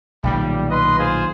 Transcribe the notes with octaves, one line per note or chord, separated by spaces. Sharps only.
B1 A#2 D#3 G3
B4 D#5 C6
F4 G#4 C5